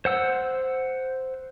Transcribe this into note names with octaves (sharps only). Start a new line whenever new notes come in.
C5 F#5 E6